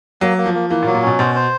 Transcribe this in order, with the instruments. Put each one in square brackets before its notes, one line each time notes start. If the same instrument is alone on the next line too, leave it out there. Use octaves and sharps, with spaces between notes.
[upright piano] F#3 [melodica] A#3
[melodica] A#3
[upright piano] F3
[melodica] A#3
[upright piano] E3 [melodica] A#3
[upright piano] A#2
[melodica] F#3
[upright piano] A#2
[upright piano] B2 [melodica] C#4
[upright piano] B2 [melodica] C5
[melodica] C5